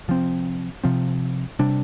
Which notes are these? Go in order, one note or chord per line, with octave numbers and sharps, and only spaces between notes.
C3 F3 C4
C3 F3 C4
C3 G3 D4